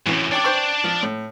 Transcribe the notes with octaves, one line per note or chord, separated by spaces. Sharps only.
F#2 A2 E3 C#4
D4 C#5 D5 G5 D6
C5 G5 C#6
F3
A2